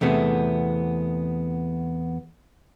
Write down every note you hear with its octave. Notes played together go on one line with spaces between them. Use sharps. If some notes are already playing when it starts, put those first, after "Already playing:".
E2 C3 A3 B3